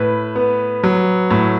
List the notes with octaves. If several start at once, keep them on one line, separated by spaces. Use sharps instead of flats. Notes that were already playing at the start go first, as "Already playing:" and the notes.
Already playing: A2 B4
B3
F#3
A2